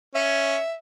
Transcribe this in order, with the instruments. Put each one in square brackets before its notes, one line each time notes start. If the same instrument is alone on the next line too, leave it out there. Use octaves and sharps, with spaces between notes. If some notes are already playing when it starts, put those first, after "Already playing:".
[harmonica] C#4 [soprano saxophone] E5